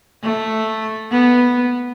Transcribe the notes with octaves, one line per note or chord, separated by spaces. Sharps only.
A3
B3